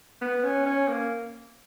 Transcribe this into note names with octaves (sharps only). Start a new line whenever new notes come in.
B3
C#4
C#4
A#3